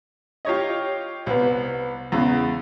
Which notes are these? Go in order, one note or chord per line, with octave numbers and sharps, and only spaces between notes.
F4 G4 C#5 D#5
C2 B3
E2 C#3